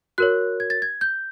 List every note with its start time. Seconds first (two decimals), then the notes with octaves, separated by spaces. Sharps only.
0.18 F#4 A#4 C#5 F#6
0.60 G#6
0.70 A6
0.82 G#6
1.01 G6